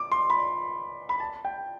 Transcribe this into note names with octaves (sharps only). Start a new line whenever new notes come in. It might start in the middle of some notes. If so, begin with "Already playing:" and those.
Already playing: D6
C6
B5
B5
A5
G5